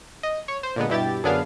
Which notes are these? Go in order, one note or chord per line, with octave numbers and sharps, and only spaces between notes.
D#5
C#5
C5
A#2 D3 G#3 B3
G2 B2 E4 G4 A6
F#2 D3 B3 D4 G#4 F5